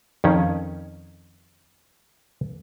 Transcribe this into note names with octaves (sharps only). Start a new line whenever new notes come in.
F2 D#3 C#4